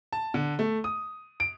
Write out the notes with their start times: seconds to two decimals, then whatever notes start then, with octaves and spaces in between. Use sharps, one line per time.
0.13 A5
0.34 D3
0.59 A3
0.84 D#6
1.40 D7